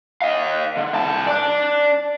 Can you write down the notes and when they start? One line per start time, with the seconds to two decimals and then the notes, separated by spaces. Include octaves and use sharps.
0.22 D#5 F5
0.77 D3
0.95 C2 A5
1.27 D5 A5